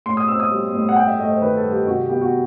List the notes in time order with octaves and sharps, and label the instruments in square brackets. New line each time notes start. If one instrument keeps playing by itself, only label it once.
[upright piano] A2 C6
D#6
C4 E6
D#6
G3
A2
F#5
G2 G5
E5
A3 D#5
C5
D#3 B4
A4
G2
G4
C3 F#4
G4
B3 G4
F#4